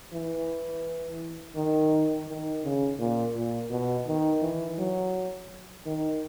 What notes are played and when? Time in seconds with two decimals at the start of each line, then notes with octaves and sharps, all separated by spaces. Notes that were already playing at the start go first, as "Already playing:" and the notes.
0.14 E3
1.56 D#3
2.28 D#3
2.64 C#3
3.00 A#2
3.36 A#2
3.71 B2
4.08 D#3
4.42 E3
4.79 F#3
5.86 D#3